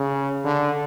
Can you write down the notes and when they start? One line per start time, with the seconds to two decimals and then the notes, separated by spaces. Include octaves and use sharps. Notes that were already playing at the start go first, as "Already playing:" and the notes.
Already playing: C#3
0.44 D3